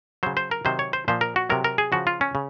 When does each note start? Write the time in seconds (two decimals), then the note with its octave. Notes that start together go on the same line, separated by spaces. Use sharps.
0.23 C#3 F#3 C5
0.37 C5
0.51 A#4
0.65 C3 D#3 F#3 C5
0.79 C#5
0.93 C5
1.08 A#2 F3 C5
1.21 A#4
1.36 F#4
1.50 C3 F#3 A#4
1.64 A#4
1.78 G#4
1.92 C#3 F3 F#4
2.07 F4
2.21 C#4
2.35 C#3